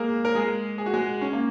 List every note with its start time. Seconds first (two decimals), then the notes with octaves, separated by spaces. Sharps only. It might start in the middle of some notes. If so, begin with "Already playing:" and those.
Already playing: G#3 A#3 G#4 A#4
0.25 A#4
0.35 G#3 G#4
0.78 G#4
0.86 F#4
0.94 G#3 G#4
1.21 C#4
1.33 A#3